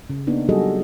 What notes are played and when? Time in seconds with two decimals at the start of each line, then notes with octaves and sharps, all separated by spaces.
0.10 C#3
0.27 A#3 B3 D4 D#4
0.49 F#3 G3 F#4 G#4 A4 D#5